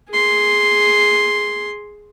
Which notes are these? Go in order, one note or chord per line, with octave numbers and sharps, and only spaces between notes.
G#4 C6